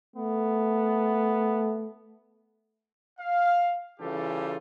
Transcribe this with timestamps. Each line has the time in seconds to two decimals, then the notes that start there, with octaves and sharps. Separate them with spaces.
0.16 A3 B3
3.20 F5
4.00 C#3 E3 G3 F4 G4 A4